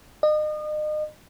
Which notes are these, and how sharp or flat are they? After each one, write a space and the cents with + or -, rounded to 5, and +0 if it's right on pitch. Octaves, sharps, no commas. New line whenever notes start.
D#5 -35